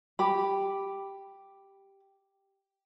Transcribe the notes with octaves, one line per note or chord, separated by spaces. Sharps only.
G4 B5